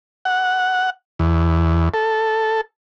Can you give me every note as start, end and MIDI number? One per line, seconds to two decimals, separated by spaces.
0.25 0.90 78
1.19 1.89 40
1.94 2.61 69